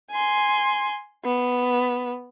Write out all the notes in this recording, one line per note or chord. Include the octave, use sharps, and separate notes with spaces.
G#5 C6
B3